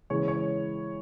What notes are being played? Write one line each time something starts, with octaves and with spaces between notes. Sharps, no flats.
C#3 E3 G#3 C#5
C#5